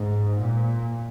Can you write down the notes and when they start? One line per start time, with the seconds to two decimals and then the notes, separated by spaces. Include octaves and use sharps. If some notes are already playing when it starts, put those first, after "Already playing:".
Already playing: G#2
0.41 A#2